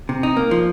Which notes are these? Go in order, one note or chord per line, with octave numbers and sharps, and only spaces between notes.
C3
D#4
A#3
F3